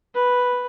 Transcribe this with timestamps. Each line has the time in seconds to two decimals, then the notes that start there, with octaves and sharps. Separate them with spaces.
0.15 B4